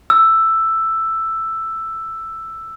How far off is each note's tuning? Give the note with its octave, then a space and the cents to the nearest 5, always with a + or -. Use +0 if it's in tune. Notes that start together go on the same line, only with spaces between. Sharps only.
E6 +5